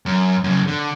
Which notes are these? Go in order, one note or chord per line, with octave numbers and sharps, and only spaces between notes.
F#2
F#2 C#3
D3